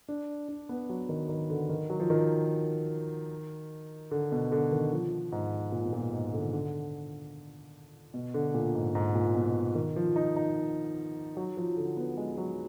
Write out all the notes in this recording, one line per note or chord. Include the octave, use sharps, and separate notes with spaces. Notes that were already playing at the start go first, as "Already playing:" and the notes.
D4
D4
B3
F#3
D#3
D#3
D3
D#3
F#3
F3
D#3
D3
B2
D3
D#3
F3
G#2
A#2
B2
A#2
G#2
D3
D#3
D3
B2
D3
A#2
G#2
G#2
A#2
B2
D#3
F3
D#4
D#4
F#3
F3
D3
B3
G#3
F#3